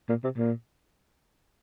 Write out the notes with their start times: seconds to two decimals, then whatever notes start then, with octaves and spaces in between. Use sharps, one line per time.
0.09 A#2
0.24 C3
0.38 A#2